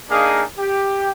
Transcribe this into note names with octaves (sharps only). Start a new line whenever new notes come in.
A#3 D4 D#4 G#4 D#5 F5
G4